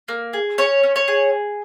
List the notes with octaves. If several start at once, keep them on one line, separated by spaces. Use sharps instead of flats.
A#3
G#4
C#4 C#5
C#4
C#5
G#4